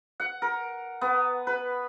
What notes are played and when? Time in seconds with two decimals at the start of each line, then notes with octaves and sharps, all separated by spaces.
0.20 F#5
0.42 A#4
1.01 B3
1.47 B4